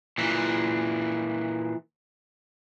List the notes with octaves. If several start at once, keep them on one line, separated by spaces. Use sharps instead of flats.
A#2 E3